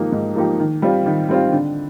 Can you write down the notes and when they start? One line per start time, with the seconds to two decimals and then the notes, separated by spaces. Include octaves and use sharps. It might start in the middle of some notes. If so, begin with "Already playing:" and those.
Already playing: G#2 F3 A#3 D#4 G4
0.12 G#2
0.35 F3 A#3 D#4 G4
0.59 D#3
0.82 G3 C4 F4
1.06 D#3
1.29 G3 C4 F4
1.52 D3